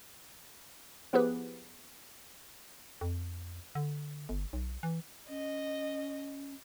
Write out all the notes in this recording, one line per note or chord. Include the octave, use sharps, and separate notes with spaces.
F3 B3 E4 G4 G#4 B4
F2
D3
G1
B1
E3
C#4 D#5